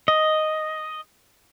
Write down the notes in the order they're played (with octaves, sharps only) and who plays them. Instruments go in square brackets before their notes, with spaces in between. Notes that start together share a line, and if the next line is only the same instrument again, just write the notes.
[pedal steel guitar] D#5